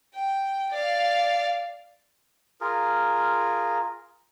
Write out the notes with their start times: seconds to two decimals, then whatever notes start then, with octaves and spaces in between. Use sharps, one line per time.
0.14 G5
0.71 D5 F5
2.61 F4 G#4 A#4